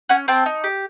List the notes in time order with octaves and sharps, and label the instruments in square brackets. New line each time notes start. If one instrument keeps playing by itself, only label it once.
[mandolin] C#4 F#5 G#5
C4 G5 A5
D#4
G4